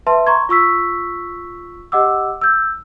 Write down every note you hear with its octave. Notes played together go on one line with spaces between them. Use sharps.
B4 E5 A5 C6
A#5 C6 C#6 G#6
F4 C#6 E6 B6
G4 D#5 F#5 D6 E6
E6 G6